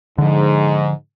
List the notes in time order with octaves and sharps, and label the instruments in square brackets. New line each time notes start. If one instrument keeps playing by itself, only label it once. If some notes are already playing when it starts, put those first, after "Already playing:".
[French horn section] G#2 [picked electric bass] D3 F3